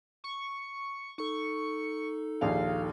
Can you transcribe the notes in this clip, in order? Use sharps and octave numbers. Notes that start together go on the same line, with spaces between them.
C#6
D#4 A4 C#6
A#1 D#2 G#4 F5